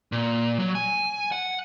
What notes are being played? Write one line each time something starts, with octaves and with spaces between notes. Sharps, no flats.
A#2
F#3
G#5
F#5